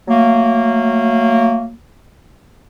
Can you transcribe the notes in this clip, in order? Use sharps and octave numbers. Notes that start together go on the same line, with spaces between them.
F#3 A3 A#3